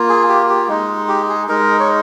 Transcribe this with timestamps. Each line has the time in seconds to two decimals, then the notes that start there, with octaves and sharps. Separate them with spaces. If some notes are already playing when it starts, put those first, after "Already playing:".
Already playing: A#3 F4
0.09 G#4
0.29 G4
0.49 G4
0.68 G#3 D#4
1.08 G4
1.29 G#4
1.48 G#3 D#4 A#4
1.80 C#5